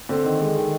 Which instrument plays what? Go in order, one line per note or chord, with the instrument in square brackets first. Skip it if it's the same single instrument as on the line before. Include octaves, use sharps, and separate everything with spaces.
[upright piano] D3 [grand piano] C4
[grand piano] D#3
G#3
D#3